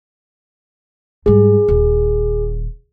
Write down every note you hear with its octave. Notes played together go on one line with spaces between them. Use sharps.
G#2 G3 G#4
D#1